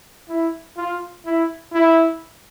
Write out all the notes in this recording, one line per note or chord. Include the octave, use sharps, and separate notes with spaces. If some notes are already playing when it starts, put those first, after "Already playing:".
E4
F4
E4
E4